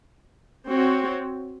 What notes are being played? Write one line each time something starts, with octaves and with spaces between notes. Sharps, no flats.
C4 F#4 C#5